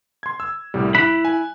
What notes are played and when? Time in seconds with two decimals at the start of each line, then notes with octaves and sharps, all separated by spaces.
0.23 C6 G#6
0.40 E6
0.74 C2 A2 G3
0.95 E4 B5 F#6
1.25 G#5